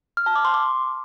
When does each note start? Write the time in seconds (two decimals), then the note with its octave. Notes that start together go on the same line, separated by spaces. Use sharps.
0.17 F6
0.26 A5
0.35 D6
0.45 C6
0.54 D6